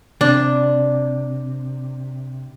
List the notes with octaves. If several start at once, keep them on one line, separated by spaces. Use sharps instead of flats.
C3 D4